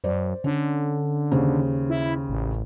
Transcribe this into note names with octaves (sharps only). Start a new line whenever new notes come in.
F#2 C5 D5
D3 C#4
D#2 C#3 C5
E4
A1